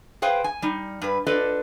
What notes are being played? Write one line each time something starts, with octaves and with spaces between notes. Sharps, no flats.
G#4 B4 C5 F5 G5
G#5
G3 D#4
G2 B4
D4 F4 A4 B4 D#5